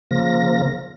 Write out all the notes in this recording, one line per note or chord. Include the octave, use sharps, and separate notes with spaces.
C#3 F3 A#3 A#6